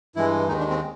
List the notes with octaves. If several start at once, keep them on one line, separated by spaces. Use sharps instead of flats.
G2 E3 G#3 E4
D#2 D#3 G#3 D#4
D4
C4